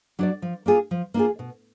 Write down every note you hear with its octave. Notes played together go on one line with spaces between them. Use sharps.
F#3 D4 F#4 D5
F3
A#3 D4 F4 G#4
F3
A#3 D4 F4 G#4
B2